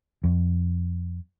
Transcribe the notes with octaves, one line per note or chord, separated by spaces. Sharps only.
F2